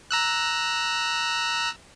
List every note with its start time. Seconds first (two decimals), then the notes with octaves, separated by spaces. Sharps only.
0.11 A#5 E6 F#6